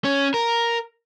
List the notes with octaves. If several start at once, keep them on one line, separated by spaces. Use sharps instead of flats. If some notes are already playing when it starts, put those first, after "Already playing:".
C#4
A#4